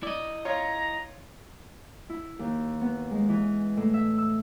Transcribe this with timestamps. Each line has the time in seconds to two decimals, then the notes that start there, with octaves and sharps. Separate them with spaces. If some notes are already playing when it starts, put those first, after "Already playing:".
0.03 E4 D5 D#5
0.45 F4 C#5 A#5
2.10 E4
2.39 D#2
2.81 B3
3.11 G#3
3.29 E3
3.77 A2
3.94 E5
4.18 E6